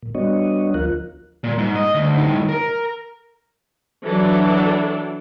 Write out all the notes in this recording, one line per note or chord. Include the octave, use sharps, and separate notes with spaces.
A#2
G3 B3 D4 F#4 C#5 D#5
D2 F3 F4 A#4 F#6
A#2
G#2
D#5
D2
A2 D#3
A#4
E3 F#3 D4 A4